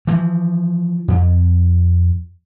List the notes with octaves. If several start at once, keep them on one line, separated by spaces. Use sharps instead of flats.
E3 F3
F2